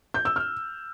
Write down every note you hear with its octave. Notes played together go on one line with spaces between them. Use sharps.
G6
E6
F6